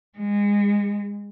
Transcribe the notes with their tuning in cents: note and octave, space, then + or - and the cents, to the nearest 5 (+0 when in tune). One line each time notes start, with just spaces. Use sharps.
G#3 -25